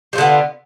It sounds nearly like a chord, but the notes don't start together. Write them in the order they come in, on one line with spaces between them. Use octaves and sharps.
G3 F4 D3 B3